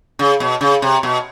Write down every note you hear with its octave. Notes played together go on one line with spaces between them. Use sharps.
C#3
B2
C#3
C3
B2